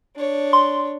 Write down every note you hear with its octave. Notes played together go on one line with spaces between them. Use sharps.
D4 C#5
C6